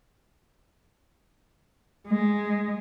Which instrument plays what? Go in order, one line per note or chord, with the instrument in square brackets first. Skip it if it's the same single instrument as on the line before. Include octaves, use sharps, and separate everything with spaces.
[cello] G#3